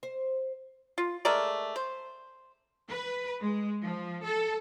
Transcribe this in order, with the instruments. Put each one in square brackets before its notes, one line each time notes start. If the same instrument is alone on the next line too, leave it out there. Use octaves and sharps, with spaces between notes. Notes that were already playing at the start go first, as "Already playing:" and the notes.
[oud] C5
[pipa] F4
G#3 A3 A#4 D5
C5
[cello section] B4
G#3
F3
A4